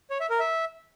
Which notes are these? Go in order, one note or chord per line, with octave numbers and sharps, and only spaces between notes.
C#5
E5
A#4
E5